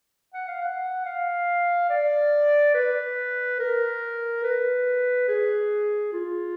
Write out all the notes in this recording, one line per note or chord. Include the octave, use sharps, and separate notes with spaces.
F#5
F5
F#5
F5
D5
B4
A#4
B4
G#4
F4